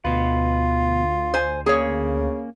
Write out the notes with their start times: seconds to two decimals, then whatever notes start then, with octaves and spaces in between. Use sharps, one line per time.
0.05 D2 B2 F4 B4
1.34 C5 G#5
1.66 C#3 A#3 C#4 G#4 C#5